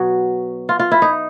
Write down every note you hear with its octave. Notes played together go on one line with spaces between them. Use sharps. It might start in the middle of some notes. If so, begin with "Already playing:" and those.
Already playing: B2 F#3 F#4
F4
F4
E4
D#4